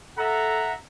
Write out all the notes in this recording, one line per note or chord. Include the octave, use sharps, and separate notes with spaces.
A4 E5 F#5 A#5